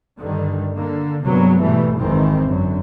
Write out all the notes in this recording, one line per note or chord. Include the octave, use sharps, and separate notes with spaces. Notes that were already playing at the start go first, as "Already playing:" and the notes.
G2 D3 D#3 G3
D3 A#3
G2 C3 F#3 G#3 A#3 B3
G#2 B2 E3 G3 A3
G#1 F2 G#2 D#3 E3 C4
F#2 D3